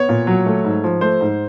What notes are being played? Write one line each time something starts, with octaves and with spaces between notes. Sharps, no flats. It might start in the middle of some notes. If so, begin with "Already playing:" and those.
Already playing: B3 C#5
A#2
F#3
A3
G#2
F3
A3 C5
G#2